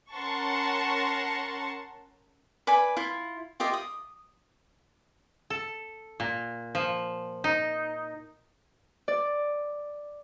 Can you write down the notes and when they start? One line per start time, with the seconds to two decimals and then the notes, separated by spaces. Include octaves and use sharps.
0.13 C#4 A#4 F#5 A5 C6 C#6
2.67 B4 D5 G#5 B5
2.97 E4 F4
3.60 F4 G4 D#5 E5
3.73 D#6
5.50 A4
6.20 A#2
6.75 F3
7.44 D#4
9.08 D5